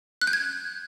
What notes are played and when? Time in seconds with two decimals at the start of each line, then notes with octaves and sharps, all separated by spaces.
0.22 F#6
0.27 G6
0.33 G#6